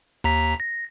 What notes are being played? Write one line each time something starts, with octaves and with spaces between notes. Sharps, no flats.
D#2 A#5 B6
A#6